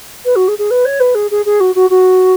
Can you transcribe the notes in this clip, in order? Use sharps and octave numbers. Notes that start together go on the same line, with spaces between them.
B4
F#4
G#4
G#4
B4
C#5
B4
G#4
G#4
G#4
F#4
F#4
F#4